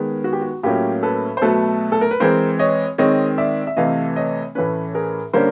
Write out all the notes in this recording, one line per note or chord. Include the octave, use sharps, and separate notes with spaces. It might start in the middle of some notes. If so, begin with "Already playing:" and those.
Already playing: D#3 G#3 B3
F#4
G4
F#4
A2 F#3 A#3 C#4 F4 G4
A4 B4
C5
B2 F#3 A3 A4 B4
A4
A#4
B4
E3 G#3 C4 A#4 C5
C#5 D#5
D#3 G#3 C4 C#5 D#5
D5 E5
E5
C3 E3 A3 D#5 F5
C#5 D#5
A2 E3 A3 C#4 B4 C#5
G#4 A#4
D3 G3 A#3 C#4 A#4 C5